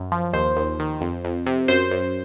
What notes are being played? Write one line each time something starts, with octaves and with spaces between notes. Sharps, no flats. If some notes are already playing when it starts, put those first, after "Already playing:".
Already playing: F#2
F3
D#2 C5
D#2
D#3
F2
F2
C3
F#2 C5
F#2